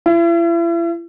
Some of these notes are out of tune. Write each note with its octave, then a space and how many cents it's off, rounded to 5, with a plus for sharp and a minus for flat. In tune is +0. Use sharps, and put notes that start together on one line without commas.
E4 +40